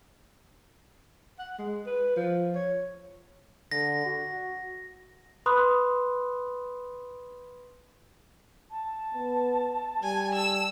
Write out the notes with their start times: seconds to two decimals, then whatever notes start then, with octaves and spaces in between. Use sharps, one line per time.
1.39 F#5
1.59 G#3
1.86 B4
2.16 F3
2.55 C#5
3.71 D3 A#6
4.06 F#4
5.46 B4 B5 C6 D#6 F#6
8.71 A5
9.14 B3
10.03 G3 G#5
10.35 E6